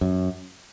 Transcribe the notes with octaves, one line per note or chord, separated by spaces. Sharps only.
F#2